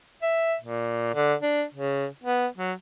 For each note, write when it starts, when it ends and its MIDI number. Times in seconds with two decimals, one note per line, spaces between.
0.23 0.56 76
0.62 1.10 46
1.15 1.34 50
1.42 1.64 62
1.74 2.06 49
2.24 2.47 59
2.58 2.73 54